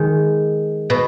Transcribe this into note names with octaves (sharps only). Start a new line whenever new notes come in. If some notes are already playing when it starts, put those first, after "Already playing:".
Already playing: D#3 G#3
B2